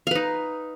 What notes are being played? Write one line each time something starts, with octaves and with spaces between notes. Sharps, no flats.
D#4 B4 F5